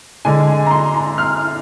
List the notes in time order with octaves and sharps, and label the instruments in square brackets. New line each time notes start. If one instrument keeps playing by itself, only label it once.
[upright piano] D3 G#3 D4 G#5
G#5
A#5
C6
A#5
F6